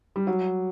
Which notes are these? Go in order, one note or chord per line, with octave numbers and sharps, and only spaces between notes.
G3
F#3